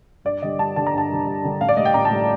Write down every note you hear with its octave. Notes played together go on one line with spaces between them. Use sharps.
G2 D5
D3 G3 D#5
G2 A5
D3 G3 A5
A#5
G2 A5
D3 G3
G2
D3 G3
A1 F5
D5
A2 G3 D#5
G5
A1 A#5
A5
A2 G3